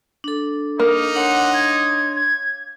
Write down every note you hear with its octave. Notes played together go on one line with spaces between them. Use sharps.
D4 A4
A#3 D#4
D4 C#5 F#5 C6
G#6
G#6